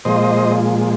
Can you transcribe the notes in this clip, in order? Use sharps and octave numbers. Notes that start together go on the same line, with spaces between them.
A#2 F3 G#3 C5 D#5